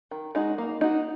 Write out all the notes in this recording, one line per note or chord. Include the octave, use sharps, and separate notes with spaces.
D#3
G#3 D#4 F#4
A#3
D#4 F#4